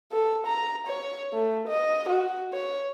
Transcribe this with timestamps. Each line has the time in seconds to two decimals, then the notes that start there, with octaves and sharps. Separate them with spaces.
0.12 A4
0.47 A#5
0.87 C#5
1.33 A3
1.68 D#5
2.09 F#4
2.53 C#5